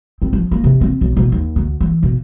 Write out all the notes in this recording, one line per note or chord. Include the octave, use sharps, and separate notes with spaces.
C4
F3
A#3
C3
C4
B1
B2
D#2
D2
E3
B2